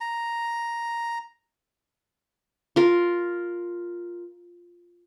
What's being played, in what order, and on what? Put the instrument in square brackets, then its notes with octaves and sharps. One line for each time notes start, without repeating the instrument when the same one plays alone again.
[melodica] A#5
[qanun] F4 A#4